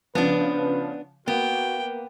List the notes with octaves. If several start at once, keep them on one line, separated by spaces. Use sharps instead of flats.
C#3 F3 B3 D4 B4
A#3 B3 F#4 G5